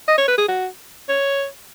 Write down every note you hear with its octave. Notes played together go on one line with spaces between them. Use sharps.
D#5
C#5
B4
G#4
F#4
C#5